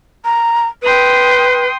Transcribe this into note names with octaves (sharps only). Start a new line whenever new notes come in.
A#5
B4 G5 C6 D#6